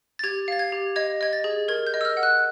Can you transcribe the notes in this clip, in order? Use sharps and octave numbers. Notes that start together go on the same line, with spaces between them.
A6
G4 G#6
F5 A6
G#6
G4
D#5 G#6
D#5 G#6
A6
G#4
A#4 G#6
G6
D#5
E6
F6
F#5
F#6